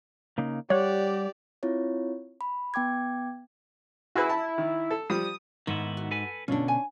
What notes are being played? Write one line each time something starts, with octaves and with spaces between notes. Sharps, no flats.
C#3 A#3 D#4
G3 G4 C#5 D5 F#5
C4 E4 F4 C#5
B5
B3 G5 D6 G#6
E4 F#4 G#4 B4
A5
D#3
A4
F3 G3 D#6
G#2 D#3 B3 E4
F#4
A4 B4 G#5
B2 D3 C#4 D4 F4
G#5